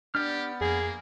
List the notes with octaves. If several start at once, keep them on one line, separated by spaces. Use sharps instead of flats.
B3 D4 G4 D5 F6
F2 A#3 G#4